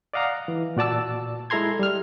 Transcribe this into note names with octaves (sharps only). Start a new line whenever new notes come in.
D5 D#5 F5 F#5 A#5
E3
A#2 F#4 D5 A5 E6
G#3 E4 A4 A#5 C6 G#6
G3 F6